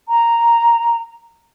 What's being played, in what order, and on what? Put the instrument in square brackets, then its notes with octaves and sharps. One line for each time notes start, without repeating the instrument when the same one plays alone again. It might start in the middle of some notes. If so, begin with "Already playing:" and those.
[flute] A#5